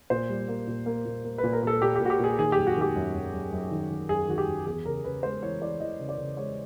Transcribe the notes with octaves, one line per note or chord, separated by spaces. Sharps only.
A#2 C5
G3
A#3
A#2
A#3
A#2
A#3
B4
A#2
A#4
A#2 A4
A#2 G4
A#2 G4
F#4
G4
A#2 G#4
D#3 G#4
F#2 G4
F#4
D#3 G4
F#2
F#2
F#2
F#2
D#3
D#3
F#2 G#4
D#3 F#4
G4
F#2
E2 G#4
C#3 A#4
C#3 B4
G#3 C5
E3 C#5
E3 D5
E3 D#5
C#3
D5
C#3
G#3 C#5